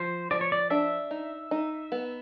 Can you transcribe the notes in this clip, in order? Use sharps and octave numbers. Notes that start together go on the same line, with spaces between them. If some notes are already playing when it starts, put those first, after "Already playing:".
Already playing: F3 C5
F3 D5
C#5
D5
D4 E5
D#4
D#4
B3